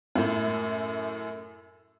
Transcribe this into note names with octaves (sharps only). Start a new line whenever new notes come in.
F#2 A2